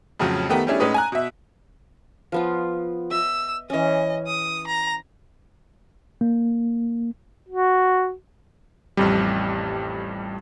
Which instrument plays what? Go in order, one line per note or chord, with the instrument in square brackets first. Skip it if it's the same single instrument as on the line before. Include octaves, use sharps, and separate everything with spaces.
[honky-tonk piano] F2 A2 C#3 F3 F#3
D#3 A3 B3 G4 A#4
G3 A3 C#4 D4 E4 G#4
A2 G#3 C#4 D#4 B4 D#6
G#5 A#5 F#6
B2 E5
[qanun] F3 B3 F4
[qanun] D#5 E5 [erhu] E6
[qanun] E3 C#4 [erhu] D#5
[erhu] D#6
A#5
[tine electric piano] A#3
[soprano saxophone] F#4
[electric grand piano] A1 F2 G3